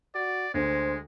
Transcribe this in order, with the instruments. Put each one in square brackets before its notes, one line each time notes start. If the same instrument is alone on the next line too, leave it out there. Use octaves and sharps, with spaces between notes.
[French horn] F#4 [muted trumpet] D5
[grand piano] D2 [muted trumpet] G#3 [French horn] C5